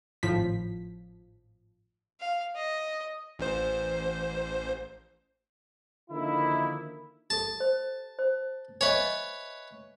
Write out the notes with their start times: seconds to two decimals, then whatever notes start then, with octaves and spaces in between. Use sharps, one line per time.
0.23 G#1 A2 F3 B6
2.21 F5
2.56 D#5
3.39 A1 C5
6.10 D3 D#3 F3 A#3 D#4 E4
7.30 G4 A4 A5
7.60 C5
8.19 C5
8.81 B4 C#5 D#5 E5 G#5